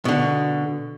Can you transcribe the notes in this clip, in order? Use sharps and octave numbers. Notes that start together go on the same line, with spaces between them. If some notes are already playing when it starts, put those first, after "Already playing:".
B2 D3